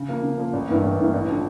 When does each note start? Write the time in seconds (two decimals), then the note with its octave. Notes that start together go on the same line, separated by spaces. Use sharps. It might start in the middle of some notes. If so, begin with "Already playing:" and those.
Already playing: C#3
0.08 F3 A#3
0.23 C#3
0.38 F3 A#3
0.53 A1
0.68 G2 E3 A#3
0.84 A1
0.98 G2 E3 A#3
1.13 A1
1.28 D3 F3